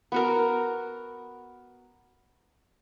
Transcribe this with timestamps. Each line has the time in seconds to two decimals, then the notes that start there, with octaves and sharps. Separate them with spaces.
0.12 B3 F#4 A#4